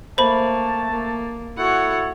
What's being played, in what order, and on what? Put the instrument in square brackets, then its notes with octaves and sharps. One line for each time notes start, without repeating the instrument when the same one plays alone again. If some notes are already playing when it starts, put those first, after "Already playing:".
[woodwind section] A3 A5 [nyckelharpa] A#3 [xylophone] C5 B5
[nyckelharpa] A#3
[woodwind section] E4 A4 C#5 [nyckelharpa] F#4 F#5